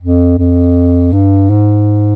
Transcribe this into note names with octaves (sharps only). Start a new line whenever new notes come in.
F2
F2
G2
G#2